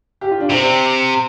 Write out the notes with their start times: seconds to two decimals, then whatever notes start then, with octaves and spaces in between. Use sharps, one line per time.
0.21 G4
0.31 F4
0.40 D4
0.49 C3 C4